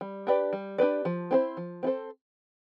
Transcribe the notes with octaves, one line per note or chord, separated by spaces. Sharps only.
G3
D4 G4 B4 D5
G3
D4 G4 B4 D5
F3
C4 E4 A4 C5
F3
C4 E4 A4 C5